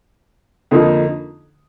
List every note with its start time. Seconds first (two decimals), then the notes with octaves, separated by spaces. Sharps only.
0.71 F2 D3 F3 A#3 D#4